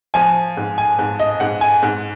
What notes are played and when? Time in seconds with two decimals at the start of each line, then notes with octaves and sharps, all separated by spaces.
0.14 F3 G#5
0.57 G#2
0.78 G#5
0.99 G#2
1.20 D#5
1.40 G#2 F#5
1.61 G#5
1.83 G#2